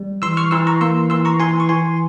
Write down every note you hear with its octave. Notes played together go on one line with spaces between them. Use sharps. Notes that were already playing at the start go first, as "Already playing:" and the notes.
Already playing: G3
E3 C6 E6
C#6 F6
E3 C6 E6
A#5 C#6
A#3 C6 E6
E3 C6 E6
A#5 C#6
E3 G#5 C6
C#6
E3 G#5 C6